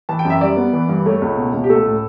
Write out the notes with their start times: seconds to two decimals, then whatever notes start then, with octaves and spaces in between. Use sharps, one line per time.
0.09 E3 A5
0.19 G5
0.25 F#2
0.30 E5
0.41 G3 D5
0.57 B3
0.73 E3
0.89 G2
1.06 A3 C#5
1.22 C#2
1.37 B2
1.54 C#2
1.64 G4
1.70 A3 A4
1.86 A2